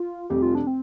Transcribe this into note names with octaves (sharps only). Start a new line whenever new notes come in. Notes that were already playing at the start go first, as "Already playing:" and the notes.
Already playing: F4
F1 F2 C3 G3 G4
F4
D4
C4